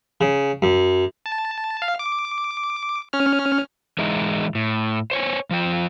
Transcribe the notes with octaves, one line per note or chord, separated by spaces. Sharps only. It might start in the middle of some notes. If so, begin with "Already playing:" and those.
C#3
F#2
A5
F5
D6
C#4 F6
E3 G#3 D#4 E4
A2
C5 C#5 G#5
F3 F4 G5